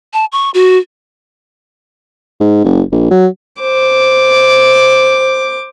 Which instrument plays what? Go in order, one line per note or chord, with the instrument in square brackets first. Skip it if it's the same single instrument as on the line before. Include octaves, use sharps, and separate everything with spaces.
[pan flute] A5
C#6
F#4
[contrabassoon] G#2
F#1
A#1
F#3
[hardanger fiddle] C5 D6